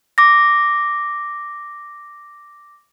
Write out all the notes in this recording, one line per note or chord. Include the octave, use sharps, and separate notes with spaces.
D6 A#6